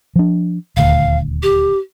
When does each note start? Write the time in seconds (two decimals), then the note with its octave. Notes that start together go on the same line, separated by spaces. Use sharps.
0.16 F3 D4
0.77 D#1 D2 F5
1.43 G4